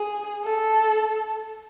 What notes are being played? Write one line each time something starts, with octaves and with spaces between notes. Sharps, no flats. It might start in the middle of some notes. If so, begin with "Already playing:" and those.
Already playing: G#4
A4